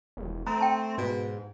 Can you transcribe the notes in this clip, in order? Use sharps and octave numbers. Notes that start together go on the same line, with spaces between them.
E1
A3 C4 A#5
G5 A5
G#2 B2